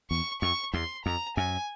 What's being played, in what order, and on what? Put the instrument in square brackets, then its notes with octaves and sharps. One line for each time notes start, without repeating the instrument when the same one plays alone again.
[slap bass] E2 [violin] C#6
[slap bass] F2 [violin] C#6
[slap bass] E2 [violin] C6
[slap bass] F2 [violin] A#5
[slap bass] F#2 [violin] G#5